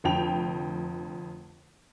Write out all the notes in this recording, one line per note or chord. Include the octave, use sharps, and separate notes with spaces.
F1 F2 D3 G5 F7